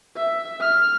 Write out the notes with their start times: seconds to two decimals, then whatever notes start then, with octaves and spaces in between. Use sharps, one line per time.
0.17 E5
0.61 F6